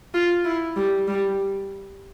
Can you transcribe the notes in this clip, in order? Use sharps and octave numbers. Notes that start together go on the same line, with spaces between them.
F4
E4
G3
G3